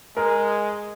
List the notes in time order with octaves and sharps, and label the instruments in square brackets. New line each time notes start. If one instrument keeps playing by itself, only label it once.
[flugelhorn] G#3 [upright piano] A#4